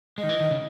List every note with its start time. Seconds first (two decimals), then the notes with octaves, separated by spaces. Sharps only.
0.18 G#3 D#5
0.23 D#3
0.29 E3
0.40 D#3
0.51 C#3